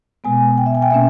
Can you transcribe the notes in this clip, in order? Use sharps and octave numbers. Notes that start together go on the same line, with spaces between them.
B2 G#3 B3 G#5
G5
E5
G#5
G5
B2 A#3 C#4 E5